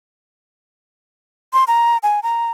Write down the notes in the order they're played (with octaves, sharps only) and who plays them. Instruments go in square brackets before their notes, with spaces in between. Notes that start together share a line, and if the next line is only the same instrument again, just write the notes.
[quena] C6
A#5
G#5
A#5